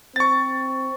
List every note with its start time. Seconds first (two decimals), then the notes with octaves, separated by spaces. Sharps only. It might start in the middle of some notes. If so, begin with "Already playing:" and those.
0.16 C4 C#6 A6